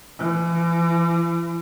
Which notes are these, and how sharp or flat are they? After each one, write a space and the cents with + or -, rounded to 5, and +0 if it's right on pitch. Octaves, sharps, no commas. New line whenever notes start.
E3 +40